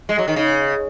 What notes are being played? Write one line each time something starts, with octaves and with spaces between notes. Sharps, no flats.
G#3
F#3
D#3
C#3